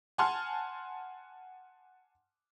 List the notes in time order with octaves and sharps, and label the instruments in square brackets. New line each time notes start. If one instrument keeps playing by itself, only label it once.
[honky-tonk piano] F#5 G#5 A5 C6 F6